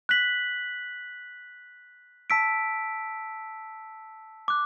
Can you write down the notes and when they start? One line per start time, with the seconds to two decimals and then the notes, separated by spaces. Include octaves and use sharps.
0.09 F#6 B6 F#7
2.30 A5 E6 B6 D7
4.48 D6 F#6